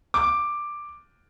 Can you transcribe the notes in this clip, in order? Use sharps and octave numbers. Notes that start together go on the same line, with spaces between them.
D6